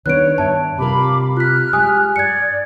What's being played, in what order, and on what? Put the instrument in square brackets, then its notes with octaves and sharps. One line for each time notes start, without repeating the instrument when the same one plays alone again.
[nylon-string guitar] D#3 B3 D4 [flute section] C#5 [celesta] F#6 D7
[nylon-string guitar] G2 E5 [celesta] A5
[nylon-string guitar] C3 G3 A#4 [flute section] F4 B5 D6
[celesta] F4 B6 [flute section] F6 F#6
[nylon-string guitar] G#3 [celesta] G4 G#5 D#6
[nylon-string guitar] G2 [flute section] D5 [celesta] G#6 C#7